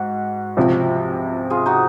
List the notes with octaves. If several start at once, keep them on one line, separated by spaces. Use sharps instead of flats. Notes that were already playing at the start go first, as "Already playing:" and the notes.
Already playing: G#2 F#4
C#2 C3 F3
F4 G#4
D#4 F#4